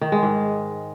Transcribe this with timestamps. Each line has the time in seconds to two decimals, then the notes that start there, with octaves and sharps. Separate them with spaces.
0.01 D#3
0.12 G#3
0.23 G#2